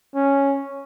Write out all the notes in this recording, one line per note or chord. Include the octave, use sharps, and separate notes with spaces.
C#4